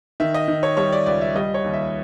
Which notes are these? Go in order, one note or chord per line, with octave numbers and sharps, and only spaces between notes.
D#3 E5
D#5
D#3
C#5
G3 C#5
D5
C#2 D5
E5
G3 D#5
C#5
D#2
E5